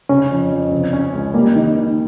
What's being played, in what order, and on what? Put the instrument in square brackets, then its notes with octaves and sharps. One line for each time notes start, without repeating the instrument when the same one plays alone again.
[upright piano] C#3 [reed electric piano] C#4
[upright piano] F2
F2
[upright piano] C#3 [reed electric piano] C4
[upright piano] C#4
C#2
[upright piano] G3 [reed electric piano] A#3
[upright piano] D#3
D#3